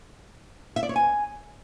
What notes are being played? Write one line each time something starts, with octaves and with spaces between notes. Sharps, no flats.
E5
D5
C#5
G#5